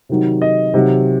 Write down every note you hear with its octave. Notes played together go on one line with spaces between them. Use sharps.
C3 D#3 F#3
D#5
C3 D#3 F#3